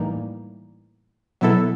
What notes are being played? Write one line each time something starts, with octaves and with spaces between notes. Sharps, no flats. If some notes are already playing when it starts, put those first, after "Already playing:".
Already playing: A2 E3 G3 A#3 D#4
B2 F#3 B3 E4 A4